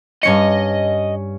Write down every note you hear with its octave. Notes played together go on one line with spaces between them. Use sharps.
G2 C#4 D#5 C#7